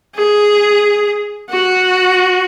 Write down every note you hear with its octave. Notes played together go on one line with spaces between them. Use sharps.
G#4
F#4